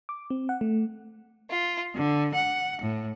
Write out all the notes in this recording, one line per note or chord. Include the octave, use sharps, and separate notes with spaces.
D6
C4
F#5
A3
F4
D3
F#5
A2